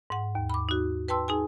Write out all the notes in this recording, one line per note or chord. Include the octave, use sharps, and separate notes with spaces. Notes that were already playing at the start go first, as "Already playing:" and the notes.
G#2 F#5
D#2
B5 D6
D#4 F#4
B4 G5 A5 C6 E6
D#4 G#4 G#5